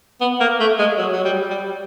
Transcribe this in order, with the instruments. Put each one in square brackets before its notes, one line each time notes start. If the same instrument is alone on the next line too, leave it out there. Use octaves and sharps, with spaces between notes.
[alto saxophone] B3
A#3
A3
G#3
F#3
F#3
G3
G3